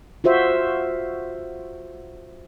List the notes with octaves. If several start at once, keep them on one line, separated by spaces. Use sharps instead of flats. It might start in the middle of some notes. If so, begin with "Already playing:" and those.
F4 F#4 C5 E5